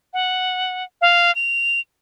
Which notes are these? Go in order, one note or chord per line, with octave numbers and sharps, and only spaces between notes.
F#5
F5
F7